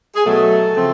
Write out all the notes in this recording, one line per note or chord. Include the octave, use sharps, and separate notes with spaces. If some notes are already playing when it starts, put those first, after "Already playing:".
G#4
B2 F#3 A3 A4
C#3 F3 A3 C4